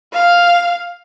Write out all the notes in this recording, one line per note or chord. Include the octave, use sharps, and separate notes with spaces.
F5